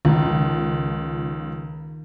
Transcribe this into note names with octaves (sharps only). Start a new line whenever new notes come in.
C#2 D#3 F3